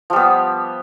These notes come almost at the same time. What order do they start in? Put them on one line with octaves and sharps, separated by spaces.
F3 G3 B3